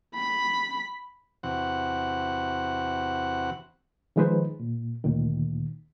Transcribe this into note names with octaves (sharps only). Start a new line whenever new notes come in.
B5
E2 C3 F#4 F#5
D#3 F3 G#3 D#4 B4 C5
A#2
D2 A#2 D#3